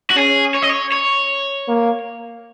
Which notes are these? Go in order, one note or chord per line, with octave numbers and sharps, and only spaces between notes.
F#4
C#4 G#4
C#5
D#5
C#5
C#5
A#3